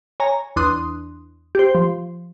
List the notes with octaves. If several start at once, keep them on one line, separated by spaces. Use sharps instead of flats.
C#5 G#5 A#5
E2 D4 C6 D#6 F#6
G4 C5
F3